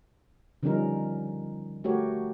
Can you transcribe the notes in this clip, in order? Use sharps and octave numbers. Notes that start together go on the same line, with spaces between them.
D3 F3 G3 C#4 D#4 A#4
A3 F#4 G4 A#4 C#5